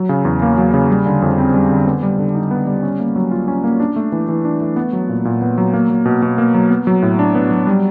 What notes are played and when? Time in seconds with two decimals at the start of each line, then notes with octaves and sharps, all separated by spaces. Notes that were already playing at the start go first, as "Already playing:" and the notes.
Already playing: F#3
0.09 C#3
0.25 E2
0.42 A#3
0.58 F#3
0.74 C#3
0.90 G3
1.06 D3
1.22 F2
1.38 C4
1.54 G3
1.71 D3
1.86 B3
2.03 G3
2.19 D3
2.35 D#4
2.51 B3
2.67 G3
2.83 C#4
3.00 A#3
3.16 F#3
3.31 F4
3.48 C#4
3.64 A#3
3.80 D4
3.96 A3
4.12 E3
4.29 E3
4.45 D4
4.61 A3
4.76 B3
4.93 F#3
5.09 A#2
5.25 A#2
5.42 B3
5.58 F#3
5.73 A#3
5.90 F#3
6.05 B2
6.22 B2
6.38 A#3
6.54 F#3
6.70 B3
6.87 F#3
7.02 A2
7.19 D4
7.35 B3
7.51 F#3
7.67 G3